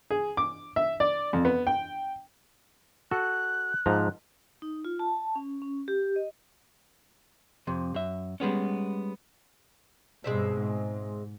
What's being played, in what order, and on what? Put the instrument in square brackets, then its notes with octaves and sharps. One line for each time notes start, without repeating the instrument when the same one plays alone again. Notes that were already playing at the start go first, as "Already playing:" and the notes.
[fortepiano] G#4
D6
E5
D5
F2
B3
G5
[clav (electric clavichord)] F#4 A4 [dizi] F#6
[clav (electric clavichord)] G#2 F3 A#5
[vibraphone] D#4
F4
A5
C#4
C#4
G4
D#5
[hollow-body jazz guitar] F2 C3
F#2 E5
G3 G#3 B3 C#4
[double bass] G2 B2 [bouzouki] G#3 C4 E5
[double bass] G#2